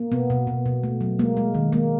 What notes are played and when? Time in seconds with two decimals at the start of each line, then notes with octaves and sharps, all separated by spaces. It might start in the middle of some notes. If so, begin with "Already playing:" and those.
Already playing: A#3
0.12 B2 B3
0.30 B2
0.47 B2
0.66 B2
0.83 A3
1.01 F#3
1.19 G#3 A#3
1.37 G#3
1.55 D#3
1.72 G#3 A#3